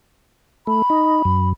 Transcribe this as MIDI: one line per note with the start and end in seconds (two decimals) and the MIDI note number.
0.67 0.82 57
0.67 1.49 83
0.90 1.22 63
1.25 1.53 42